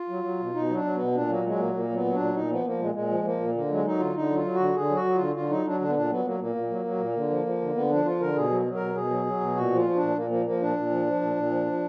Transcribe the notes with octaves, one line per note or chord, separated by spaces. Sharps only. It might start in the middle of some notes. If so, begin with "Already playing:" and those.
Already playing: F4
F#3
F#3
B2
B2 D#4
F#3
D4
F#3
B2 B3
A#2 D4
F#3 A#3
F#3 G#3
A#2 A#3
A#2 A#3
F#3 B3
F#3
D4
A#2
A#2 D#4
F3 B3
F3 A#3
A#2 G#3
A#2 G#3
F3
F3 A#3
A#2
D3 A#3
F#3 G#3
F#3 D#4
D3 F4
D3 D#4
F#3 F4
F#3
F#4
D3
D3 G#4
F#3
F#4
F#3
D3 F4
D3 F4
F#3 D#4
F#3 D4
D3 D4
B3
A#2 D4
F#3 B3
F#3 A#3
A#2 A#3
A#2
F#3
F#3
A#2
D3
F3
F3
D3
D3 B3
F3 D4
F3 F4
D3 A#4
B2 G#4
F#3
F#3
A#4
B2
B2 G#4
F#3
F#3
B2
A#2 F#4
F3
F4
F3
A#2 D4
A#2 A#3
F3 A#3
F3 A#3
A#2 D4
A#2
F3
F3
A#2
A#2
F3
F3